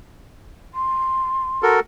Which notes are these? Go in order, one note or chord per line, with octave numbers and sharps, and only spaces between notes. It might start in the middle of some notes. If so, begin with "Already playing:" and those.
C6
F#4 A4 A#4